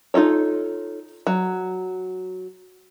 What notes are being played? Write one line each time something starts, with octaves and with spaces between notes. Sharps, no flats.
D#4 F4 A4 C#5
F#3